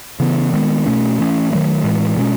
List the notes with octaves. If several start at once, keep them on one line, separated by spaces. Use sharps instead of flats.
C#3 E3 B3
D#3 G#3 B3
B2 A3 C#4
E3 A3 C#4
D#3 F#3 A3
A2 E3 G#3
B2 G#3 C#4